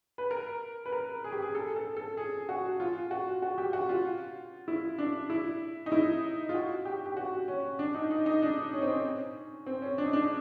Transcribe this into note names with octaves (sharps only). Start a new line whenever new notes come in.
B4
A#4
B4
A#4
G#4
G4
G#4
A4
A4
A4
G#4
F#4
F4
F#4
F#4
G4
F#4
F4
E4
D4
E4
D#4
E4
F4
F#4
G4
G4
F#4
C#4
D4
D#4
D#4
D#4
D4
C#4
C4
C#4
C4
C#4
D4
D#4
D4